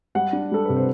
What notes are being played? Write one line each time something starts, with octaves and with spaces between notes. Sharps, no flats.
G3 F#5
D4
G3 A4
C3 B4
C5